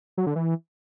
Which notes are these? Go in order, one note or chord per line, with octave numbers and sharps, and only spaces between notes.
F#3
D3
E3